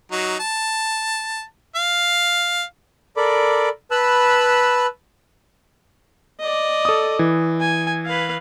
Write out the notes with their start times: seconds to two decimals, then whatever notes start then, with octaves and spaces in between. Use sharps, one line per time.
0.11 F#3 D#4
0.40 A5
1.76 F5
3.17 A4 A#4 D5 B5 D6
3.91 B4 A5 B5 E6 F#6
6.40 D5 D#5
6.85 A4 D#6
7.19 E3
7.60 G#5
8.06 B4 F5